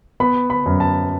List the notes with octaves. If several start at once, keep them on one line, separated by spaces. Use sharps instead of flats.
B3 B5
B5
F#2
A5